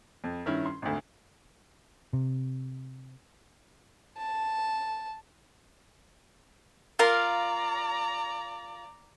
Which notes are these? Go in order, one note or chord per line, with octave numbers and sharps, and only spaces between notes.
F2
G2 D#3 C#4 E4
C6
G#1 D2
C3
A5
F4 A#4 D5 F5 A#5